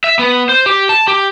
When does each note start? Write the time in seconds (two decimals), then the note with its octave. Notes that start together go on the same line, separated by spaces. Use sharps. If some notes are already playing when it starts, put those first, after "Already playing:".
0.04 E5
0.19 B3
0.49 C5
0.66 G4
0.89 A5
1.08 G4